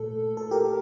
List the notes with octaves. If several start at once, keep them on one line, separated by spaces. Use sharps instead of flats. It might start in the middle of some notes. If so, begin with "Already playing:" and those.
Already playing: A#2 A3 A4
A4
G4 A#4